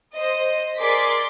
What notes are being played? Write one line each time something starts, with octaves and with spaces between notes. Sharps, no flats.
C5 D#5
G#4 A#4 D5 C6 D6 B6